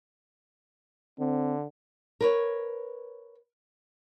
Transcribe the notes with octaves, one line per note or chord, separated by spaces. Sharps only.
D3 C4
A#4 B4 C#5